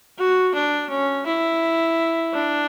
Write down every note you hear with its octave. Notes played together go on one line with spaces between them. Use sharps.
F#4
D4
C#4
E4
D4